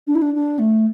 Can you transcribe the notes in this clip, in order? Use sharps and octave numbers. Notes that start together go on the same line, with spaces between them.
D4
E4
D4
D4
A3